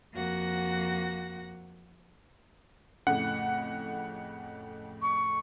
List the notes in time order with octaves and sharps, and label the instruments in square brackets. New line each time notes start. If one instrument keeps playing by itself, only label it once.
[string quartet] F2 A#3 F#4 F#5 A#6
[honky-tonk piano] F2 A2 C#3 [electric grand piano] F#5
[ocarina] C#6